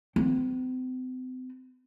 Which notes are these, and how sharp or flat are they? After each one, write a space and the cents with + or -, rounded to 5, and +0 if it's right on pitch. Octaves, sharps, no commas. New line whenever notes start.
C4 -40